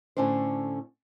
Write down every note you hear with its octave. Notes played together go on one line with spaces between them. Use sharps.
A2 D3 C#4 D4 C5